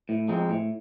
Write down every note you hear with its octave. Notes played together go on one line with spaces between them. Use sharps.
A2
F3 G#3 C4
A2